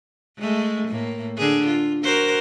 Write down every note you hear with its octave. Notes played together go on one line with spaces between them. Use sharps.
G#3 A3
A2 A#3
D3 G#4
F4
F#4 A#4 C5